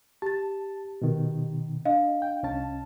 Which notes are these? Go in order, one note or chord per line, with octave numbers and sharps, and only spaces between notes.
G4 A5 A6
B2 D#3
D4 D#5 F5
G5
C2 C#4 A5